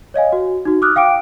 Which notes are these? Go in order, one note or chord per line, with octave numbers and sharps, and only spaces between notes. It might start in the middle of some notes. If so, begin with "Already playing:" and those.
C#5 D#5 F5 G#5
F#4
D#4 F#4
D6 D#6 F6 F#6
F5 G5 D6 D7